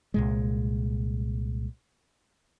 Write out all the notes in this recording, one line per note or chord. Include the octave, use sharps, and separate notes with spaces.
C2 A#2 G#3